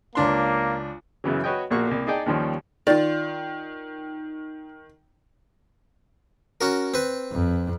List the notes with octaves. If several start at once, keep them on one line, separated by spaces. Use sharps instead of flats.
C#2 A#3 D4 C6
F#2 C#3 E3 F#3
F#4 B4 C#5 D#5 G5
A#1 A#2 A#3 F#4 C#6
C2 A#3
D#4 G#4 D5 D#5 G5 A5
D#2 D#3 F3 G3 C#4
D#3 F4 D5
C#4 F#4 A#4
C4 B4
F2